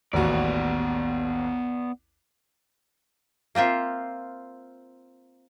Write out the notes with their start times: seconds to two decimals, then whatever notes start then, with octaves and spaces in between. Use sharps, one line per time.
0.13 A1 D#2 B3 F#4 D5
3.55 A#3 C4 F4 E5